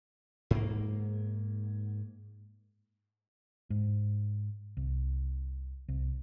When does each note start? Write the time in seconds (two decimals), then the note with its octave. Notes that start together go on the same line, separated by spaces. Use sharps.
0.51 G#2 A#3
3.70 G#2
4.77 C2
5.88 C2